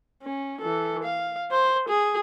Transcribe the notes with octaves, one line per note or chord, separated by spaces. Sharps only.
C#4
E3 A4
F5
C5
G#4